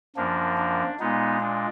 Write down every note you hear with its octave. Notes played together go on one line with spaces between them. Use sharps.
F#2 F3 A#3 D4
D4
A#2 G#3 B3 D#4
D4